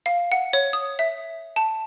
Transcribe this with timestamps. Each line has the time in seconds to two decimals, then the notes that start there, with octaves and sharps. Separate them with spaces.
0.06 F5
0.32 F#5
0.53 C#5
0.73 D#6
0.99 E5
1.56 A5